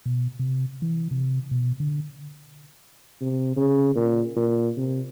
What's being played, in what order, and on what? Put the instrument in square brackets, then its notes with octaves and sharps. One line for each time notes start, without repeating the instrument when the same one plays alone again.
[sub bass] B2
C3
E3
C3
B2
D3
[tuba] C3
C#3
A#2
A#2
C3